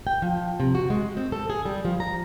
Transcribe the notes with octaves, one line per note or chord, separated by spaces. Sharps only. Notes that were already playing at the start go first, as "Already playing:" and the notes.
G5
F3
C3
F#4
G#3
C4
A4
G#4
G3
F3
A#5